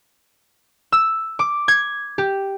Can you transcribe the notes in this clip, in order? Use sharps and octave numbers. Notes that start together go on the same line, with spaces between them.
E6
D6
G#6
G4